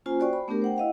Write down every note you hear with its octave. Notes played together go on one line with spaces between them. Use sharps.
A#3 C#4 F4 C5 G#5
F#4 C5 D5 G5 C#6
B5
A3 B3 D4 G4 A#4
C5 F#5 G5
E4 D#5 F5 F#5